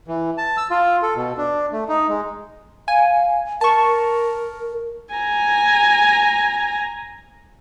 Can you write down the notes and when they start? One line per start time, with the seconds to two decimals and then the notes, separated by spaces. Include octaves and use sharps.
0.08 E3
0.38 A5
0.57 E6
0.70 F4
1.03 A4
1.16 B2
1.38 D4
1.72 A3
1.89 D#4
2.09 G#3
2.88 F5 G#5
3.61 A#4 A5 C#6
5.14 G#5 A#5